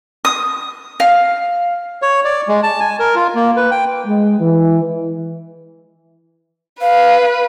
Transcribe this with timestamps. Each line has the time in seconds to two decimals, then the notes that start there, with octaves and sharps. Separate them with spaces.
0.25 D#6
1.00 F5
2.02 C#5
2.24 D5
2.48 G#3
2.63 A5
2.80 G#5
3.00 A#4
3.15 F4
3.35 A#3
3.56 B4
3.71 G5
4.06 G#3
4.40 E3
6.81 B4 F5